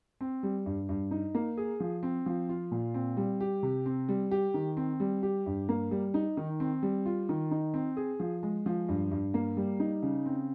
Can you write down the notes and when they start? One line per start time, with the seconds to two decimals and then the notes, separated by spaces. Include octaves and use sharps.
0.21 C4
0.43 G3
0.66 G2
0.89 G2
1.11 D#4
1.35 A#3
1.57 G#4
1.80 F3
2.03 C4
2.26 F3
2.49 F4
2.71 A#2
2.94 C4
3.17 G3
3.40 G4
3.63 C3
3.86 C4
4.09 G3
4.31 G4
4.54 D#3
4.77 C4
5.00 G3
5.23 G4
5.46 G2
5.69 A#3
5.91 G3
6.14 D#4
6.37 D#3
6.60 C4
6.83 G3
7.06 F4
7.29 D#3
7.51 D#4
7.74 C4
7.97 G#4
8.20 F3
8.43 G#3
8.66 F3
8.89 G2
9.11 G2
9.34 A#3
9.57 G3
9.80 D#4
10.02 C#3
10.25 C4